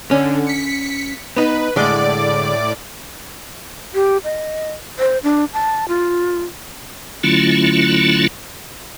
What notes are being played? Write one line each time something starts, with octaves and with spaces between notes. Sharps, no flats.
D3 C#4
B6 C#7
B3 D#4 B4
A2 D3 G#3 D5 D6
G4
D#5
C5
D4
A5
F4
D3 F#3 A3 C#4 E4 F4